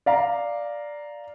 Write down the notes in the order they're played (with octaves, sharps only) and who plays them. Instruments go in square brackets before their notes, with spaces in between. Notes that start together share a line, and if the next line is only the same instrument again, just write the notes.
[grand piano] D5 F5 A#5